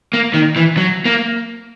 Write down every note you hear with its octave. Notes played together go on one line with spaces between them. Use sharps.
A#3
D#3
E3
F#3
A#3